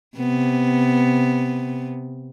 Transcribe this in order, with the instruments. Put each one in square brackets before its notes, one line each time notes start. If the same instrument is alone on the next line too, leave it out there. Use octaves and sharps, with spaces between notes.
[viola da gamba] C3 B3